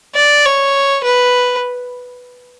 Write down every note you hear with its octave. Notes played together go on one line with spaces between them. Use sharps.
D5
C#5
B4